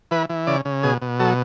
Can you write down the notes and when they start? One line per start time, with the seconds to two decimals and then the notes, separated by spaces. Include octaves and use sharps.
0.11 E3 B4
0.29 E3
0.47 C#3 D5
0.65 C#3
0.83 B2 G#4
1.02 B2
1.20 F#3 A4